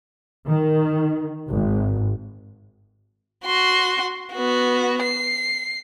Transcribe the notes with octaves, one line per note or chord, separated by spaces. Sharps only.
D#3
G#1
F#4 C6
B3 F#4
C7